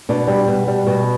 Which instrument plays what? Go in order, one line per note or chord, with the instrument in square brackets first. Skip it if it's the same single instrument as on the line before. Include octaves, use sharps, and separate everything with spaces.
[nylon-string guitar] B2 D4
G3
B2
G3
B2